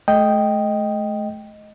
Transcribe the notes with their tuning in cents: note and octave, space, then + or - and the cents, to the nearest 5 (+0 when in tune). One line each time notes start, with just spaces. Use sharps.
A3 -40 D#5 +0 G5 +0